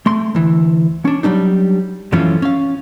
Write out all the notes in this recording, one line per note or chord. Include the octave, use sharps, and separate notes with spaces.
A3 C6
D2 E3
C#4 D4
F#3 G3 D4 D#4
F#2 E3 F3 A3 C#4 F4
C#4 F5